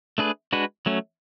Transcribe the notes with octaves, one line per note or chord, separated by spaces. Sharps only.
A3 D4 G#4 B4
G#3 D4 F#4 B4
F#3 A3 C#4